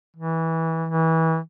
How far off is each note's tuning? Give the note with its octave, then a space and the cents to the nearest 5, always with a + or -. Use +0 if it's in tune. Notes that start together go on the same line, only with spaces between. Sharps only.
E3 -20
E3 -25